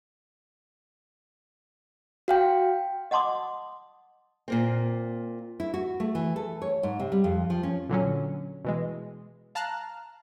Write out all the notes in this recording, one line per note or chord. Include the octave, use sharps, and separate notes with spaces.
F#4 F5 G5
D#5 F#5 A5 C6 D6 D#6
A#2 A#3 C4
E4
F#4
A3
E3
A4
C#5
G#2
C3
G3
F2
F3
C#4
A#2 D3 F#3 C#4
B2 E3 G#3
F5 A5 A#5 F6 F#6